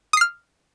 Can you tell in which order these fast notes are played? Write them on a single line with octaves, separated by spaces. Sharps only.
D#6 C7 F6